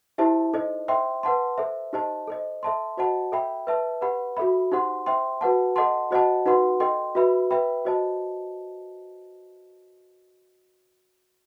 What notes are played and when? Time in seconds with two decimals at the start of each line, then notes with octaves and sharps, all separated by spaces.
0.18 E4 G4 C5 E5 A5
0.54 D#4 A4 C5 D#5
0.88 C5 E5 G5 C6
1.23 B4 F#5 A5 C6
1.58 A4 C5 E5
1.93 D#4 G4 C5 D#5 A5
2.27 A4 C5 D#5
2.63 A4 E5 A5 C6
2.97 F#4 C5 D#5 F#5 A5
3.32 A4 E5 G5 B5
3.67 B4 E5 A5
4.01 G4 B4 F#5 B5
4.37 F#4 A4 E5 B5
4.72 D#4 G4 C5 F#5 C6
5.06 C5 E5 G5 C6
5.41 F#4 B4 F#5 A5
5.76 A4 D#5 F#5 A5 C6
6.11 F#4 C5 D#5 F#5 A5
6.46 D#4 F#4 B4 F#5 C6
6.80 A4 D#5 G5 C6
7.15 F#4 B4 E5 B5
7.51 B4 E5 G5 B5
7.85 F#4 C5 D#5 A5